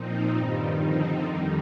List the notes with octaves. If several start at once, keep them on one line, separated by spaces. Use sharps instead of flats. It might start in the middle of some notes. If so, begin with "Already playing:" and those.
Already playing: A#2 F3 C4 D#4
G2 D#3 G3
D3 F3 C4 D#4
F2 D#3 G3